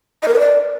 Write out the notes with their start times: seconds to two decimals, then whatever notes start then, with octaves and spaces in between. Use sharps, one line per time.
0.23 D#5
0.28 A#4
0.33 B4
0.39 D5